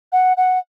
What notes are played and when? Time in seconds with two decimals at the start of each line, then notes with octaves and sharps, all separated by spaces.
0.13 F#5
0.37 F#5